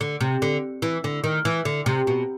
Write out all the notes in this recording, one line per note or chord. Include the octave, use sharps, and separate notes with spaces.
D3
C3
D3
E3
D3
D#3
E3
D3
C3
B2